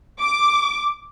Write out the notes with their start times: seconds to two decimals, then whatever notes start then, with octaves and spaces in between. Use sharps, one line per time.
0.20 D6